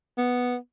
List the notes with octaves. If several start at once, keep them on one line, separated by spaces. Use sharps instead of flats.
B3